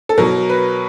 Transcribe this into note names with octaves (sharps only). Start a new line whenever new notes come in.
A4
B2 F#3 A#4
B4